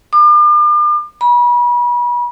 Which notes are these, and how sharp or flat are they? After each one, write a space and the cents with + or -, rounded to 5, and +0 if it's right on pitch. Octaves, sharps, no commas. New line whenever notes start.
D6 +40
B5 -35